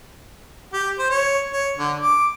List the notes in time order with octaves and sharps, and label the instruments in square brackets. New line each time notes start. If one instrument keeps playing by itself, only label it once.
[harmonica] G4
C5
C#5
C#5
D3
D6